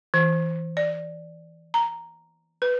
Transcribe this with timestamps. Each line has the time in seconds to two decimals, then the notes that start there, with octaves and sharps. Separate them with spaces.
0.14 E3
0.77 D5
1.74 A#5
2.62 B4